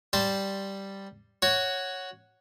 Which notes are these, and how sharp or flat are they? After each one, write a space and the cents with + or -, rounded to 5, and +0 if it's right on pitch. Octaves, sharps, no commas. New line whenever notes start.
G3 +0 C5 +0 A5 +0
F#4 +0 C#5 +0